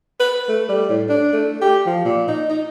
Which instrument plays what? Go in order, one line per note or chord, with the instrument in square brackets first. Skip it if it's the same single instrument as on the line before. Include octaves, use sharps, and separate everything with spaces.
[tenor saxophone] B4
A3
G3
A2
D4
A3
G4
F3
A#2
D#4
D#4